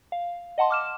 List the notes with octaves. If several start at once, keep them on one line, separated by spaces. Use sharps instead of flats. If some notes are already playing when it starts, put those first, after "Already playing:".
F5
D#5 F#5 A5 C6
D6 F6 E7